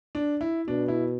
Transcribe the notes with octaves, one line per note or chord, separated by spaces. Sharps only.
D4
E4
B2 D4
E4